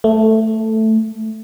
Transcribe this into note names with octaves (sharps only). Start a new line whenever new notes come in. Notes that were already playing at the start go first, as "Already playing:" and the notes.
A3